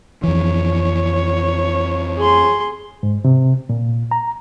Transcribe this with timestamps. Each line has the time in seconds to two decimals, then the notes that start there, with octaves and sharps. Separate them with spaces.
0.24 F2 E3 C#5
2.17 G#4 C6
3.03 G#2
3.25 C3
3.69 A#2
4.11 A#5